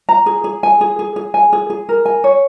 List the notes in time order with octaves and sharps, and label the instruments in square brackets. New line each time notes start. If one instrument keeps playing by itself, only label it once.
[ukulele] A#5
G#4
G#4
G#5
G#4
G#4
G#4
G#5
G#4
G#4
A#4
G#5
C#5